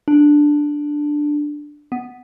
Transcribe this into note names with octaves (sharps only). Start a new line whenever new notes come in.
D4
B3